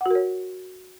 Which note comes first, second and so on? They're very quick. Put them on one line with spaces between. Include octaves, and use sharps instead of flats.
F#5 F#4 A#4 C#5